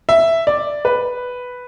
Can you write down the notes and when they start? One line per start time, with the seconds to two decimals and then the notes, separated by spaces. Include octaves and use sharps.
0.09 E5
0.47 D5
0.85 B4